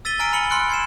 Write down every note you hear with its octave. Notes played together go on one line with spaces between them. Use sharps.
E6 A6 B6 D#7 G7
G#5 A#5 F6 C7 D7 D#7
B5 F6 C#7 F#7 G7
B5 C6 F6 F#6 D7
G#6 C7 E7